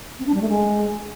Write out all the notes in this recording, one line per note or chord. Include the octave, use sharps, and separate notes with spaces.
C4
D4
G3
A3
G#3